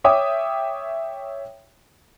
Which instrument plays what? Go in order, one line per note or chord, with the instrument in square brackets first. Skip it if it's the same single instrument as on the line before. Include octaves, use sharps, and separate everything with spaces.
[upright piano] C#5 E5 G5 D6 D#6